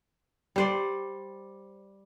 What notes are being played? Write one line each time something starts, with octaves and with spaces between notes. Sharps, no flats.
G3 C5 D5